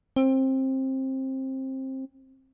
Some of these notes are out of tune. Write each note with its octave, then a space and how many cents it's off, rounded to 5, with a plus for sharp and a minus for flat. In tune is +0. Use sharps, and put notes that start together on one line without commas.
C4 +20